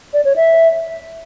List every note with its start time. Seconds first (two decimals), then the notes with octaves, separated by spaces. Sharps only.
0.14 D5
0.25 C#5
0.36 E5